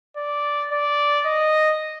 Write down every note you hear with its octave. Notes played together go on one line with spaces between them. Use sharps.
D5
D5
D#5